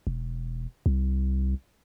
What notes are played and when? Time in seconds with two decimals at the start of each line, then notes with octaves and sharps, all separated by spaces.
0.07 E1
0.86 C2